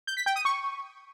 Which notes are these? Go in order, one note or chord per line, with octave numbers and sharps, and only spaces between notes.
G6
B6
G5
D#6
C#6